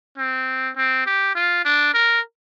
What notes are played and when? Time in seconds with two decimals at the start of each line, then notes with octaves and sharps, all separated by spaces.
0.18 C4
0.76 C4
1.06 G4
1.35 F4
1.65 D4
1.94 A#4